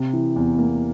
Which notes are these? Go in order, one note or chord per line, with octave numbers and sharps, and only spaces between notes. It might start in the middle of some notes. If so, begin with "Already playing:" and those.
Already playing: C3
E3
E2
A#3